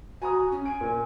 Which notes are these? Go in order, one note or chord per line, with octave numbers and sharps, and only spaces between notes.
F#4 G#5 A#5 D#6
C#4
G#5 D7
A#2